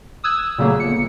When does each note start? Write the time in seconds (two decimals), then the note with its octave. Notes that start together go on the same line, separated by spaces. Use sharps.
0.24 D#6 E6 F#6 G#6
0.58 A#2 C#3 F#3 A3 A#3
0.80 G1 C#7